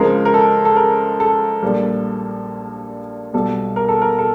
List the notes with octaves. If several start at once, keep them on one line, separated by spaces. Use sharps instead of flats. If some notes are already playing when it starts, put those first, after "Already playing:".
Already playing: C#2 C#3 F3 G#3 A#4
A#4
A4
A4
A#4
A4
A#1 A#2 G3
B1 B2 G3 A4
A#4
A4
A#4
A4